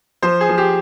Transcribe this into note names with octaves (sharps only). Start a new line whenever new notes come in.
F3 C5
G#4
F3
G4